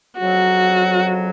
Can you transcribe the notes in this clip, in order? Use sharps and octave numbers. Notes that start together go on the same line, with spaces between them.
F2 C#3 F#3 F#4